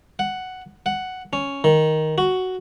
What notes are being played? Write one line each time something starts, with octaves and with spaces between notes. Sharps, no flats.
F#5
F#5
C#4
D#3
F#4